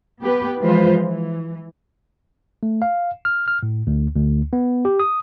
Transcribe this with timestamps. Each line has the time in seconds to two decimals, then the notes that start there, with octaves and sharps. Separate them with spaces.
0.20 B3 G4 B4
0.60 E3 F3 G#3 F4 B4 C5
1.03 E3
2.63 A3
2.82 F5
3.25 F6
3.48 F6
3.63 A2
3.87 D2
4.16 D2
4.53 B3
4.85 G4
4.99 D#6